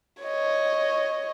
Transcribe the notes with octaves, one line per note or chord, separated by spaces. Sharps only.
C#5 D#5